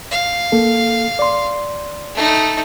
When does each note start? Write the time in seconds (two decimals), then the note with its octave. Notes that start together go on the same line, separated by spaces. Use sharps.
0.11 F5
0.52 A#3 A4
1.19 D5 C6
2.15 A3 D#4